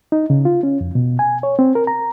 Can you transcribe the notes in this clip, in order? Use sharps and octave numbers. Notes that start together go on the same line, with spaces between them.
D#4
C#3
F4
C#4
F2
B2
G#5
C#5
C4
A#4
A#5